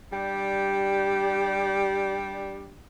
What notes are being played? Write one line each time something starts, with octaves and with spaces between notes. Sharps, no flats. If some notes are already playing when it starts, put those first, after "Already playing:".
G3 D4 G4